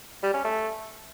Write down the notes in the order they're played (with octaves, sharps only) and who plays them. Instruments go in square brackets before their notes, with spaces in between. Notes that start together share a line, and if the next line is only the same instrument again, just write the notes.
[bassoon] G3
C#4
A3